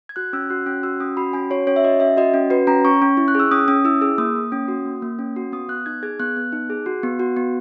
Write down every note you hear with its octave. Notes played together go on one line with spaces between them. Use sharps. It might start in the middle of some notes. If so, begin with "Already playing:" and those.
G#6
F#4 F#6
C#4 E6
F#4 F#6
C#4 F#6
F#4 E6
C#4 D#6
F#4 B5
C#4 G#5
F#4 C#5
C#4 C#5
E5
F#4 D#5
C#4 E5
F#4 D#5
C#4
F#4 B4
C#4 A#5
C#4 C#6
C#4
E4
F#6
G#4 E6
C#4 D#6
C#4 D#6
E4 E6
G#4 E6
A#3 D#6
A#3
C#4
F#4
A#3
A#3
C#4
F#4
B3 D#6
B3 F#6
D#4 G#6
G#4 G#6
B3 F#6
B3
D#4
G#4
F#4
B3
F#4
B3